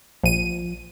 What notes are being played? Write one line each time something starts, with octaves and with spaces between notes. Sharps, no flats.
A#1 F3 D#7